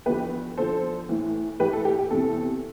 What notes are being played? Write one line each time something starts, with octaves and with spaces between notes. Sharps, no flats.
E2 D3 F3 G4 B4
E2 D3 F3 A4 C5
A2 E3
A2 E3 G4 B4
A4
G4
G4
E2 C3 E3 A4